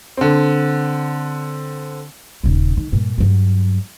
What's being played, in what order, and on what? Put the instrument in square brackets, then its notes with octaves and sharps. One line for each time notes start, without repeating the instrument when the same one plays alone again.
[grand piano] D3 C4
[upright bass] D#1 C#3
D#3
G2 A#2
G2 F#3